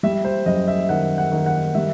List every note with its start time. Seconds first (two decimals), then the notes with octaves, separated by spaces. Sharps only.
0.03 G3 E5
0.25 C5
0.46 F#2 D#5
0.68 E5
0.89 D#3 F#5
1.18 F#5
1.32 D#3
1.46 F#5
1.75 G3 E5